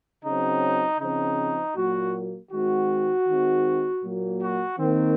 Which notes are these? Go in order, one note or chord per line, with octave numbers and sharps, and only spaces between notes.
C#3 F#3 C4 D#4
C#3 F3 C4 D#4
A#2 F#3 A#3 F#4
D#3 G#3 C4 F#4
D#3 G#3 C4
A#2 F#3 A#3
F#4
D#3 A#3 C4